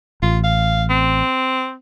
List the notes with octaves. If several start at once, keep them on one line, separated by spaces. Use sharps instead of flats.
A1 F4
F5
C4